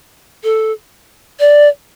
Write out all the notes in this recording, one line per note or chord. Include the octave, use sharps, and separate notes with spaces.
A4
D5